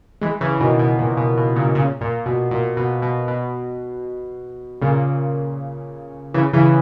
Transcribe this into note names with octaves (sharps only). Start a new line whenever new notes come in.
E3 G#3
C#3 E3
B2 D#3
B2
A#2
B2
B2
A#2 C#3
A#2 C#3
A#2
B2
A#2
B2
B2
B2
A#2 C#3
C#3 E3
C#3 E3